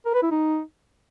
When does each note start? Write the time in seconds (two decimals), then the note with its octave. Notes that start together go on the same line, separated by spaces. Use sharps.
0.06 A#4
0.14 B4
0.23 E4
0.31 D#4